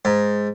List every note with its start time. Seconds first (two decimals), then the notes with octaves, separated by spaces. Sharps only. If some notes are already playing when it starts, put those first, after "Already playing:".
0.05 G#2